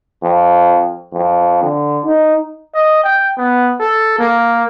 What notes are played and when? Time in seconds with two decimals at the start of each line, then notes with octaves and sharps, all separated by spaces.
0.24 F2
1.14 F2
1.64 D3
2.06 D#4
2.75 D#5
3.03 G5
3.37 B3
3.80 A4
4.19 A#3